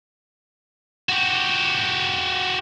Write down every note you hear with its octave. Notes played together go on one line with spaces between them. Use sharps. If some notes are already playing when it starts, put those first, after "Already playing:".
F#4 G4